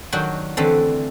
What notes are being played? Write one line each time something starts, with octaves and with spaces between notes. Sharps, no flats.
D#3 F#3 D4 F#4 G5
D3 E3 A3 C4